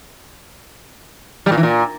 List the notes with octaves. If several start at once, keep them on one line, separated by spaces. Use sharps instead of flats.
G3
A#2
E3
A#2